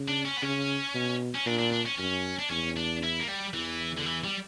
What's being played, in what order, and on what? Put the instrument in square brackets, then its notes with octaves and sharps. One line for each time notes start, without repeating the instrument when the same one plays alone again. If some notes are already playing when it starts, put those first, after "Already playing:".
Already playing: [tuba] C#3
[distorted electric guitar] D4
C#4
B3
[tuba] C#3 [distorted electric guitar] C#4
[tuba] B2
[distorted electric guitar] C#4
[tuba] A#2 [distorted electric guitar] D4
[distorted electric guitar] D4
D4
C#4
[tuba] F#2 [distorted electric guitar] C#4
[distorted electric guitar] D4
[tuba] E2 [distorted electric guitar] C#4
[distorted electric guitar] D4
E4
A#3
G3
[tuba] E2 [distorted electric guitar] E3
[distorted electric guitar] D3
E3
G3